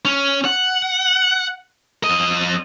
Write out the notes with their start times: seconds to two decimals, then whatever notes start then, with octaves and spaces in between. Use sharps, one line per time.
0.05 C#4
0.45 F#5
2.04 F2 D#5